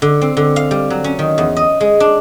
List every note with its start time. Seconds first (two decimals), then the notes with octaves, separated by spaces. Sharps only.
0.02 D3
0.21 C4
0.37 D3
0.56 F5
0.71 G3
0.90 F#3
1.04 C#4
1.19 D#3
1.38 E2
1.57 D#5
1.80 G#3
2.00 D4